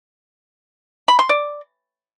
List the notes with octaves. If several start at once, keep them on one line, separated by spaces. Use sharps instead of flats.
B5
C6
D5